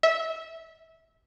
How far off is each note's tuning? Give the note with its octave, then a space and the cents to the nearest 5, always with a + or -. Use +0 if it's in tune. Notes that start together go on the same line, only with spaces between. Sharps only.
E5 -20